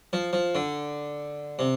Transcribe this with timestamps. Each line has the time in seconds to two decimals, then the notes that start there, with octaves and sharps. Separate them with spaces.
0.13 F3
0.33 F3
0.55 D3
1.59 C3